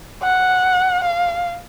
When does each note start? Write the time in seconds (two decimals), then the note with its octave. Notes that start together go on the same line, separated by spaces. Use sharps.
0.23 F#5
1.04 F5